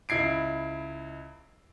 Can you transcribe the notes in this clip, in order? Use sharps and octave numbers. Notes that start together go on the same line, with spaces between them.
C#2 E4 G#6 C7 D7